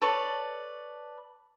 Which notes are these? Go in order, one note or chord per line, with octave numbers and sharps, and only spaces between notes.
A4 B4 C#5 D5